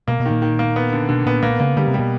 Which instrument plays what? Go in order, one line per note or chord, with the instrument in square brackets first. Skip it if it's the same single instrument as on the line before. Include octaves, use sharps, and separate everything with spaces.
[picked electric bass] B2 [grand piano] A#3
[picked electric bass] B2
[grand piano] D#3
[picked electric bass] A#2
[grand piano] D#3
A#3
B3
D3
[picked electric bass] B2 [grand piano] D3
[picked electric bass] A#2 [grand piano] B3
[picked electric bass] A#2 [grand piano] A#3
[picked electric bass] C#3 [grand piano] A#3
[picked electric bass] D3 [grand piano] G3
[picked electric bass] C3
[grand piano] G3
[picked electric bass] B2